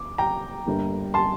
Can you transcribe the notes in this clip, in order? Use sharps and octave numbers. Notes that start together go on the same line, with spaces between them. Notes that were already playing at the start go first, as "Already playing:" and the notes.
Already playing: D6
G5 A#5
G1 G2 D3 G3 A#3
A5 C6